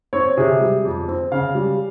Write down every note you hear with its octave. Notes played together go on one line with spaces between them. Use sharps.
C4 C#5
C3 G#4
G3
F2
C4
C#3 F5
G3